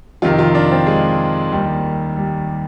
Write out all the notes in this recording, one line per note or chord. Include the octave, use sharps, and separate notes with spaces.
F2 C3 D#3 F4
F4
D4
C4
G#3
D#2 D#3 G3
G3